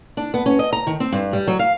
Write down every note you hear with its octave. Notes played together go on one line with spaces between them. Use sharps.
D4
B3
C#4
D#5
A#5
D#3
C4
G2
G3
F#3
F5